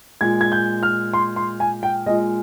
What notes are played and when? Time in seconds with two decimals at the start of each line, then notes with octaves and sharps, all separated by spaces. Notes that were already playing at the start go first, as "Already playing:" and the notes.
0.21 A#2 G#3 G#6
0.41 G#6
0.52 G6
0.83 F6
1.13 C6
1.36 C6
1.60 G#5
1.83 G5
2.06 A#2 G#3 D#5